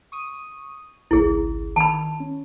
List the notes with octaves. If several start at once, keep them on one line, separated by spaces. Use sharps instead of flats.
C#6 D#6 D#7
G#1 C#2 E4 G#4
D#3 A5 B5
C#4